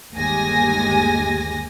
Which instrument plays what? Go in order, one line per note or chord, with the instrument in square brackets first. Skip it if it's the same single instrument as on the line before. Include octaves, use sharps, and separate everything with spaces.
[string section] G1 D#2 G#3 G4 G#5 A#6